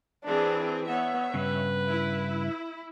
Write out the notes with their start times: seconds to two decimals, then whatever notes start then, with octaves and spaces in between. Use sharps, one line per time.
0.25 E3 C4 D4 G#4
0.87 B3 C#5 E5
1.34 G2 C#3 B4
1.89 E4